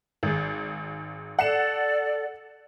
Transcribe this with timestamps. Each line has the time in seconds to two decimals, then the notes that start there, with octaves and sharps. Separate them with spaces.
0.23 G#1 G#4
1.39 A4 D5 F#5 C7 E7